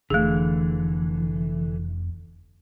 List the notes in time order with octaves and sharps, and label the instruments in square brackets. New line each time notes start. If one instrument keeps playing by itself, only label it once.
[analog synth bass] F1 [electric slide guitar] D3 E3 [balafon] A3 G#4